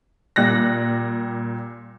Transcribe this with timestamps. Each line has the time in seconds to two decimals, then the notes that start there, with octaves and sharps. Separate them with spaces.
0.36 A#2 G3 F#6 A#6